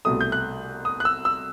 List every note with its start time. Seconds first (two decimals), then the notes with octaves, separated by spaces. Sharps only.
0.05 C2 B2 A3 D#6
0.21 G6
0.32 F#6
0.85 D#6
1.00 F#6
1.05 E6
1.25 E6